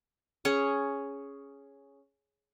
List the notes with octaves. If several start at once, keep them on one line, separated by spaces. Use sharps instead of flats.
C#4 G#4 C#5